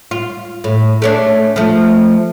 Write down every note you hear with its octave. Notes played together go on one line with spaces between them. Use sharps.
F4
A2
A3 C#4 D4
F3 A3